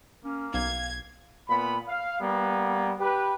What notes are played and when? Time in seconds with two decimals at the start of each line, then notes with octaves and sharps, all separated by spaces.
0.25 A#3 C#4
0.54 B1 F5 G#6
1.50 A#2 B3 B5
1.89 F5
2.20 G3 A#3 B3
3.00 G4 B4